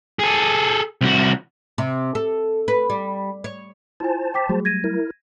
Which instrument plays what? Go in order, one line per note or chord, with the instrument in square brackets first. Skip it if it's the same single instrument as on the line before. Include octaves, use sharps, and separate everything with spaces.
[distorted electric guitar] G#4 A4
C2 F#4
[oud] C3
A4
B4
G3
C#5
[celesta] E4 F4 G#5 [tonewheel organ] C5 A5
[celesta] G5 D6 B6
[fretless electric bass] F#3 G3 A3 [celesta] F#4 G#4
[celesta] G#6 A#6 D#7
[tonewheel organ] E4 A#4